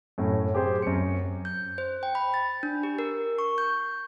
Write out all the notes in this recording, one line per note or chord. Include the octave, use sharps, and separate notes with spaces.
F#2 A2
C4 G4 G#4 C5
F#2 C#7
G6
C5
G5
B5
A6
D4
G4
A#4
C#6
G6